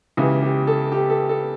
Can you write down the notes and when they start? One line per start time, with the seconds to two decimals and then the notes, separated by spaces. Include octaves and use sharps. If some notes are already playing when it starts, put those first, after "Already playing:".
0.17 C#2 C#3 E3 G4
0.42 G4
0.67 A4
0.92 G4
1.10 A4
1.29 A4